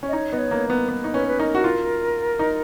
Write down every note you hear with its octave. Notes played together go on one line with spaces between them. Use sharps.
C#4
D#5
D#4 C#5
B3 D#5
C#5
A#3
B3
B3
D#4
C#4 B4
B4
D#4 A#4
F#4
F4
D#4